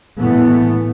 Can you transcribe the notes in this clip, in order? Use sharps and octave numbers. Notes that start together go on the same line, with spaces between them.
A2 E3 A3 B3